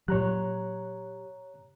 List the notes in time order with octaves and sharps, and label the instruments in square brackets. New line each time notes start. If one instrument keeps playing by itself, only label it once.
[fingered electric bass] A#2 F#3 [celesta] G4 [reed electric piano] C#5 A#5 F#6